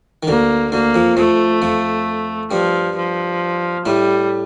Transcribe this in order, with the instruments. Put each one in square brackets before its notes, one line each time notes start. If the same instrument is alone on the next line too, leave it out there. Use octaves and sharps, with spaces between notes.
[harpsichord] D#3
[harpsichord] D2 D3 [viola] A#3
[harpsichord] D2 D3 [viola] A#3
[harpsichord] F2 F3
[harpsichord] F2 F3 [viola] A3
[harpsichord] F2 F3
[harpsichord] G2 G3 [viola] F3
[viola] F3
[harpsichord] A2 A3 [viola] G3